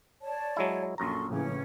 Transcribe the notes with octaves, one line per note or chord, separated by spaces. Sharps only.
C#5 D5 A5
F#3 G#3 E4
A#1 F#2 A4 A#5 C6 C#6
A2 C#3 E3 C#4